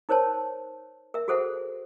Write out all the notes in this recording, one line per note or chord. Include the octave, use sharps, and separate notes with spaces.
D#4 A#4 C5 C#5 A5
A#4 E5
F#4 G#4 A4 C5 E5 F#5